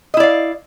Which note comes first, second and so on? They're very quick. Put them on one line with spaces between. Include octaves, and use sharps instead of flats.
D#5 E4 D5 F5